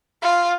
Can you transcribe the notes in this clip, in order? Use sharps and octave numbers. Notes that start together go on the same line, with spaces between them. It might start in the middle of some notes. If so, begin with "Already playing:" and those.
F4